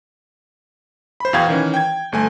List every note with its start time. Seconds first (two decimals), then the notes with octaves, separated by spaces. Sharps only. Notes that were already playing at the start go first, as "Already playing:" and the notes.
1.20 C5 B5
1.33 E2 B2 F5 G5 G#6
1.49 D#3 E3 C#4
1.74 G5 G#6
2.12 G1 A3 G#5